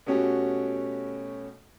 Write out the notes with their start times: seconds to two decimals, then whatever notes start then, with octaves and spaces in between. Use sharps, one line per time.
0.06 B2 A3 C#4 F#4 G4